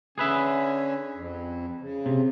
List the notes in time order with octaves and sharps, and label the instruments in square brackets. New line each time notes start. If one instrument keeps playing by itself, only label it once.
[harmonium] D3 C#4 [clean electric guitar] G#4 B4 E5
[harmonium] F2
C#3
[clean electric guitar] C3